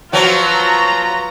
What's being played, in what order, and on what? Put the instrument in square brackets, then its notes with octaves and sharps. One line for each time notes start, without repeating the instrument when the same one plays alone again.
[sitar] F3 F#3 [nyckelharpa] F4 B4 [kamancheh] A#5